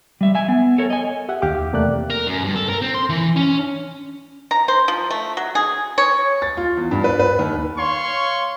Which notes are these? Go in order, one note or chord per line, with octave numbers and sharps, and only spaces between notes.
G3 E5
E5 G#5
B3
A4 A#4 C#5
D#5 G#5
G4 E5 F#5
D#2 G4 F5 D6
E2 C3 A3 A#3 D5 F#6
A#4
F#2
G2
A4
A#4
C4
C6
E3
C#4
A#5
C5
F3
A3
F#3
G#4
C#5
A6
F4
E2
G2
B4
B4
D#2
C#5 F5 C6 C#6